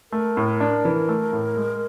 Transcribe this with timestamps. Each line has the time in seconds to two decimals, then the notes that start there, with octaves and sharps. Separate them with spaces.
0.12 A3 A#4
0.37 A2
0.60 D4
0.85 E3
1.09 A3
1.33 A2
1.56 G#3